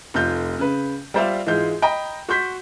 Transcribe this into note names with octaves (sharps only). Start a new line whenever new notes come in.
F1 A3 F4 G6
C#3 B4
G3 F4 C5 D5 E5 F5
G#2 E3 G#3 F4 G6
D#5 G5 A#5 B5
F#4 C6 G6 B6